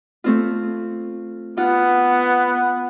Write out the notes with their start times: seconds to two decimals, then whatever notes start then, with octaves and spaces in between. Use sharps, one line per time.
0.24 A3 C4 F4
1.57 B3 F4 F#5